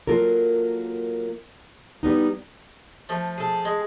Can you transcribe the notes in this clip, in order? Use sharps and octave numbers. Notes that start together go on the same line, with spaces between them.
F#3 A#3 F4 A4 A#4
G3 B3 D#4
F3 A3
G#4 A4
G#3